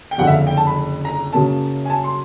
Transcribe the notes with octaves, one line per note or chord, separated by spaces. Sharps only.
G5
F#1 F2 D3 F#5
E5
F5
G5
A5
B5
A#5
F#2 C#3 F#3 A#3 A5
G#5
A5
C6